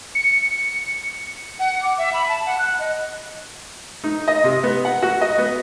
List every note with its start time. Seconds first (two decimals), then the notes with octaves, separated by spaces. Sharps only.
0.15 C#7
1.59 F#5
1.82 D6
1.98 E5
2.13 B5
2.29 A5
2.46 F#5
2.59 F#6
2.80 D#5
4.04 D#4
4.28 D#5
4.44 C3
4.63 B3
4.85 F#5
5.03 F#4
5.21 D#5
5.38 B3